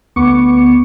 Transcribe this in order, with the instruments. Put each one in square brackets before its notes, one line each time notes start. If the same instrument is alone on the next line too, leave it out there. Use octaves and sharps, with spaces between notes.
[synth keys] D2 B3 C#6 D6 C#7